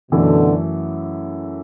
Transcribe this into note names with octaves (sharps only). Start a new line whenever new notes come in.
F#2 B2 D3 E3 A3